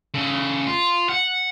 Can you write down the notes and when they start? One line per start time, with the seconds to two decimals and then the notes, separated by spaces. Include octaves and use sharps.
0.14 C#3 A4
0.67 F4
1.10 F#5